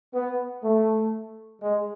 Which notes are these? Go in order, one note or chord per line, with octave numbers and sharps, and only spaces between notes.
B3
A3
G#3